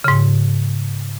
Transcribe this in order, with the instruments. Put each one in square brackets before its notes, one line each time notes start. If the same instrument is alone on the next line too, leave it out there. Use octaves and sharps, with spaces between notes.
[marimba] G#2 C#3